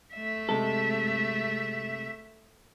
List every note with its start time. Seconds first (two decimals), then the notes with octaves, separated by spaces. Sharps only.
0.14 A3 E5
0.49 C3 G#3 A4